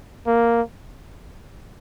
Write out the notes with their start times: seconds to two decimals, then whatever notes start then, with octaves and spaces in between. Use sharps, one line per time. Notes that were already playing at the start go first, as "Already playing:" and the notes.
0.27 A#3